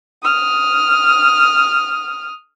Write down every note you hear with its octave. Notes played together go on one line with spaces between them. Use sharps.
D#6 F6